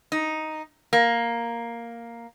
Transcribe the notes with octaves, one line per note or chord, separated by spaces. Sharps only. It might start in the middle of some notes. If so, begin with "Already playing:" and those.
D#4
A#3